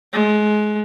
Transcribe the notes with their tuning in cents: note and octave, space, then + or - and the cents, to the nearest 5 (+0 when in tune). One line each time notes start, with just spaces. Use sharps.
G#3 +25